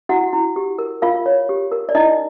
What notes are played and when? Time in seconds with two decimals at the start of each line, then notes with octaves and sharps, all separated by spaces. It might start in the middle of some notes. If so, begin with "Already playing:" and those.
0.09 E4 F#4 F#5
0.33 E4
0.56 G4
0.78 A#4
1.02 F4 A#4 F5
1.26 C#5
1.49 G4
1.72 A#4
1.89 D5
1.95 D#4 E4 D#5